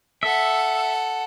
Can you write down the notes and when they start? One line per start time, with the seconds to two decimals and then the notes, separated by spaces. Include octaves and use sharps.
0.23 A4 E5 F#5